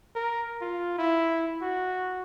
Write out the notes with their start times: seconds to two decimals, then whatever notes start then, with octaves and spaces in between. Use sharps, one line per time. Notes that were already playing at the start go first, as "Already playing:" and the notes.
0.16 A#4
0.62 F4
0.98 E4
1.62 F#4